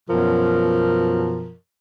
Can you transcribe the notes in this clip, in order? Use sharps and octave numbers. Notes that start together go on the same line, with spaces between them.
F#2 B2 F3 A#4